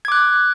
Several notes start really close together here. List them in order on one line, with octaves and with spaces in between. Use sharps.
G#6 D6 F#6